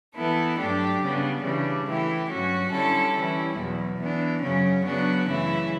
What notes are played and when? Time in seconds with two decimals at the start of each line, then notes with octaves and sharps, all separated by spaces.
0.16 E3 B3 E4 A4
0.58 G2 F#3 A3 D4 G4
1.00 C#3 G3 B3 D4
1.43 C#3 E3 G3 D4
1.86 E3 A3 E4 G4
2.29 G2 F#3 C#4 F#4
2.71 D3 G3 C#4 E4 A4
3.13 E3 G3 C#4 E4
3.56 E2 B2 F#3
3.99 E3 B3 D4
4.41 F#2 C#3 F#3 C#4
4.85 C#3 F#3 B3 D4 F#4
5.27 F#2 C#3 E3 A3 E4